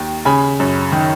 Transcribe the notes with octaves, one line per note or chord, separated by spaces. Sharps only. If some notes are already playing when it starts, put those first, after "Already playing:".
Already playing: D#2 D#3
C#3 G#5 B5
F#2
D#3